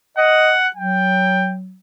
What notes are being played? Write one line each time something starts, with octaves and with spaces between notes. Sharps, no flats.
D#5 F#5
F#3 G5